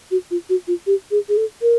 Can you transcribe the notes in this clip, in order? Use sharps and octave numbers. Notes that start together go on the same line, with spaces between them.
F#4
F4
F#4
F4
G4
G#4
G#4
A4
A#4